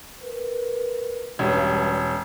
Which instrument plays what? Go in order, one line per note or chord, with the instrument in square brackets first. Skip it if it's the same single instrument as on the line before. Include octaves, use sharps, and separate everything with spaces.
[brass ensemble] A#4 B4
[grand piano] E1 C#4 [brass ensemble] G2